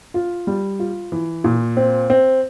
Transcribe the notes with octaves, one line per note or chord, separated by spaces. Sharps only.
F4
G3
F4
E3
A#2
C4
C4